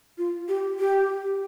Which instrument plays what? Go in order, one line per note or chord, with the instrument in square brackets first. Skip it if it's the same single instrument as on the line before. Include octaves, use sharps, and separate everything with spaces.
[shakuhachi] F4
G4
G4